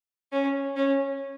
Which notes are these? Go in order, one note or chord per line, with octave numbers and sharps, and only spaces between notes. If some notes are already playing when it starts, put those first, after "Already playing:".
C#4
C#4